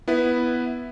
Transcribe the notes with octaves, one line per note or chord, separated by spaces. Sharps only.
B3 E4 B4